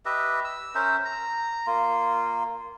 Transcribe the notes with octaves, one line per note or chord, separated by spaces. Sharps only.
G4 B4 D#5 E5
E6
C#4 A#4 C5 E5
A#5
A#3 F4